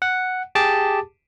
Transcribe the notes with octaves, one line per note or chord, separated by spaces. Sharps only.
F#5
G4 G#4 A5 D6